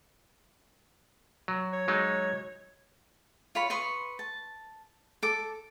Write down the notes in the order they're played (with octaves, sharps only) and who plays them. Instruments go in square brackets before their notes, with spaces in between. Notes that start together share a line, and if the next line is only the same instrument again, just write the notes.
[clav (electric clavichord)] F#3
[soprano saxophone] C#5
[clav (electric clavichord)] F#3 G#3 D#4
[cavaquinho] F4 C#5 B5 C#6
B4 C6 C#6 D#6
A5
A4 D6